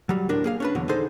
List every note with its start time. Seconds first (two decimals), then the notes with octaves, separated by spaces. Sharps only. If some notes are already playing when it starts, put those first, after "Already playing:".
0.09 F#3 G3
0.29 D2 A2 D4 A#4
0.44 A#3 G#4 F5
0.60 C#4 D4 B4
0.75 E2 B2 D3 F#3
0.89 D3 D#4 G#4 A4 C5 C6